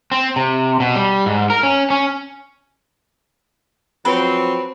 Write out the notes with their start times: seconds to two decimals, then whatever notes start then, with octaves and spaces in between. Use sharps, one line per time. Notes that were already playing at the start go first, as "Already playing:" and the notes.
0.12 C4
0.36 C3
0.80 B2
0.95 G3
1.26 G#2
1.50 A#4
1.63 C#4
1.90 C#4
4.05 F3 F#3 C4 B4